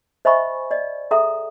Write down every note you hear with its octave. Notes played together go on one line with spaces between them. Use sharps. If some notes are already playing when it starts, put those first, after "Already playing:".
C5 D#5 E5 G#5 B5 C#6
D5 D#5
G#4 A4 E5 G5 A#5 D#6